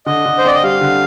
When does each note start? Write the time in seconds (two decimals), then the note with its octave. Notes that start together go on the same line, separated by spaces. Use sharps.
0.06 D3 D#5
0.26 D3
0.38 C5
0.45 C4 D5
0.54 D#5
0.63 G3 F5
0.81 D3